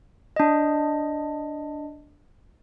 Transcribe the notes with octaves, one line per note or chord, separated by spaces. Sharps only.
D4 D#5